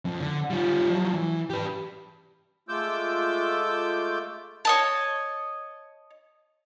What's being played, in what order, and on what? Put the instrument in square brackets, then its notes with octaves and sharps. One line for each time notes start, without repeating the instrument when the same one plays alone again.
[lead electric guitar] F2
D3
G3 F4
F3 F#3
E3
G4 B4
[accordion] G#3 A3 F4 D6 E6 G6
[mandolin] C#5 D#5 A5